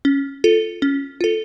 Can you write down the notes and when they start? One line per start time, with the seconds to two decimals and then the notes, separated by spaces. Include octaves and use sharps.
0.05 C#4
0.44 F4 A4
0.82 C#4
1.21 F4 A4